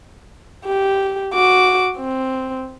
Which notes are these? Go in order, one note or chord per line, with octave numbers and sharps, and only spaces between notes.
G4
F#4 D6
C4